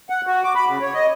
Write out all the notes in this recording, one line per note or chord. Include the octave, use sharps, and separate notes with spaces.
F#5
F#4
D6
B5
C#3
C#5
D#5